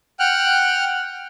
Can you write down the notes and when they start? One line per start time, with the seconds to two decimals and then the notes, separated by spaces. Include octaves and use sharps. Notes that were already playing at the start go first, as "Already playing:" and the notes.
0.20 F#5 G5 F6 F#6